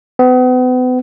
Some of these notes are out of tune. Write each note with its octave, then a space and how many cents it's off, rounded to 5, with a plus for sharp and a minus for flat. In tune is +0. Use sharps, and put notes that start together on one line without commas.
B3 +40